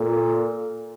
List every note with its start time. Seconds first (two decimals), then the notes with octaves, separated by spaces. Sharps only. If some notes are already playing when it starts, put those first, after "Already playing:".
Already playing: A#2 A4